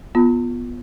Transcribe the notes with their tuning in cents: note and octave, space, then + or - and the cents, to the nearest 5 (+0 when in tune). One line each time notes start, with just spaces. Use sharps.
B3 -15 F4 +0 B5 +0